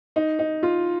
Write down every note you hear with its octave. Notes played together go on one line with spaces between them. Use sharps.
D#4
D#4
F4